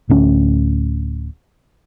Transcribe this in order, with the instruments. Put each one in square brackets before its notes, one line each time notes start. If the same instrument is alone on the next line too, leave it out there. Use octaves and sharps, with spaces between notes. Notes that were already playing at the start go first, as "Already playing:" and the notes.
[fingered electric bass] D1 D2 C#4